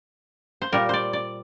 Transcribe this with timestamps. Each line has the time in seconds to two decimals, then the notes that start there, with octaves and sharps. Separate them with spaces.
0.62 C5
0.72 A#2 G3 A#4
0.89 C5 D5
1.13 D5